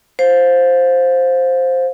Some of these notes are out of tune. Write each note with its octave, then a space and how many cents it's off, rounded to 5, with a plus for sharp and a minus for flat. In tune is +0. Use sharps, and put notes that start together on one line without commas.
C5 +0 F5 +25